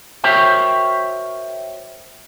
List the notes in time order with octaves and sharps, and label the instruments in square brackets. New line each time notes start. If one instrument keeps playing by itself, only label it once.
[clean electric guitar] F#4 A#4 C5 C#5 E5 G5